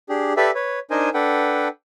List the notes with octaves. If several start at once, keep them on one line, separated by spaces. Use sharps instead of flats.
D4 G4 G#4
G4 A4 B4 D5 E5
B4 C#5
D4 D#4 A#4 C5 D#5 G#5
D4 A4 B4 F#5 G5